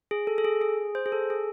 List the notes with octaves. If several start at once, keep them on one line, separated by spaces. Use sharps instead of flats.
G#4
A4
A4
G#4
G#4
C5
G#4
A4
G#4